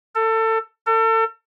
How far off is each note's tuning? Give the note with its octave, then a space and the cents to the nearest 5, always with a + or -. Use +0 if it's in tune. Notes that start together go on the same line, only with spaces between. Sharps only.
A4 +25
A4 +35